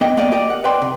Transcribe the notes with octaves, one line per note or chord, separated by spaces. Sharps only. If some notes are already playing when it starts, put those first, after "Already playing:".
B3 D#5 G5
A#3 B3 D5 D#5 F5 G5
G4 A#4 D5 D#5 G5
F#5
B4 D5 G5 C6
C3